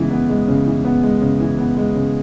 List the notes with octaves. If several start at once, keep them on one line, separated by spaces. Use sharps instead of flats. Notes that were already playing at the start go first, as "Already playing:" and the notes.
Already playing: C#3 E3 G#3 B3
B3
G#3
C#3
E3
B3
G#3
C#3
E3
B3
G#3
C#3